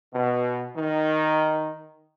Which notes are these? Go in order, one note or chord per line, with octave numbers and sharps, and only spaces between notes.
B2
D#3